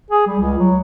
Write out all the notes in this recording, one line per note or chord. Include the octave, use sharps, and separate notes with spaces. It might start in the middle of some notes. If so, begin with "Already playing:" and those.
G#4
G3
C#2
F#3